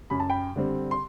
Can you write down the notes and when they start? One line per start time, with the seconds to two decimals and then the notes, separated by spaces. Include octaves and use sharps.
0.10 F#2 B5
0.20 A5
0.30 G5 B5
0.56 D3 G3 C4
0.91 C6